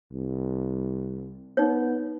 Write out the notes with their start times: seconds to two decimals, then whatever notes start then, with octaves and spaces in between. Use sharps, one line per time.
0.12 C2
1.57 B3 D#4 C#5